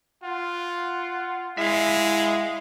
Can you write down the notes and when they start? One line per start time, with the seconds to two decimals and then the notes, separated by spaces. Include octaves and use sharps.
0.24 F4 F#5
1.58 G#3 E4 E5 F5